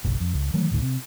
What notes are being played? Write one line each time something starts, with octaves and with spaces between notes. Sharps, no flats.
F#1 B1
F2
C#2
D#3 E3 F#3 A3
G#1 D2 A2 D3
C3